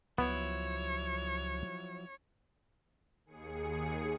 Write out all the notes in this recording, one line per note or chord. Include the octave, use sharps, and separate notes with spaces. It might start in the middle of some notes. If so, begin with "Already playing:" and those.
C#2 F3 F#3 B3 E4 C#5
D#2 G#4 C#7